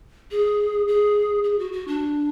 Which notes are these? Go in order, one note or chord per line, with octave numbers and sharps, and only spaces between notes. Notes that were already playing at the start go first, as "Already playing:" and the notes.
G#4
G#4
G#4
F#4
F#4
D4